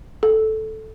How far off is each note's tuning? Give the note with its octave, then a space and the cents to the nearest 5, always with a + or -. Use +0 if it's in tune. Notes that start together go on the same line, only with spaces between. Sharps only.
A4 -10